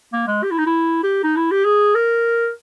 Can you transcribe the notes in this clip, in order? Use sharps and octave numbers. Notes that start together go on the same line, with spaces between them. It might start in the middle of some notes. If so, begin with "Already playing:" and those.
A#3
G#3
G4
E4
D#4
E4
G4
D#4
E4
G4
G#4
A#4